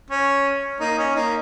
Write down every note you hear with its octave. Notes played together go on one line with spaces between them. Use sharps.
C#4
A#3 D#4
C#4
A#3 D#4